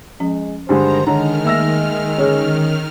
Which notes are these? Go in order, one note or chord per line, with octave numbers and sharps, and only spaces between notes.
F3 G#3 C#4
G2 D3 D#3 G#3 C5 A#5
D3 D#3 G#3 C#5 A#5 F6
A3 A#3 E5 E6 A#6
D3 C#4 G#4 C#5 D#5